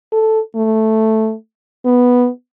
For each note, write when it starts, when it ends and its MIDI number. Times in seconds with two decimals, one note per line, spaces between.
0.12 0.40 69
0.56 1.34 57
1.86 2.29 59